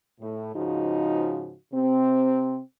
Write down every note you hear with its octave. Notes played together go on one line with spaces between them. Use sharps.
A2
G#2 C#3 F3 D#4 F#4
C3 C4